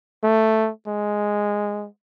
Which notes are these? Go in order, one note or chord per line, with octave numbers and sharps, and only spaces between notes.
A3
G#3